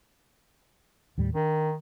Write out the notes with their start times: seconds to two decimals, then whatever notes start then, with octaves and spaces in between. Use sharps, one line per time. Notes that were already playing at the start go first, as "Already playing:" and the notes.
1.18 D#2 A2 G3
1.35 D#3 D4